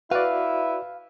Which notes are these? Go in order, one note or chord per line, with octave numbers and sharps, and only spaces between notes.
E4 F#4 B4 D5 F5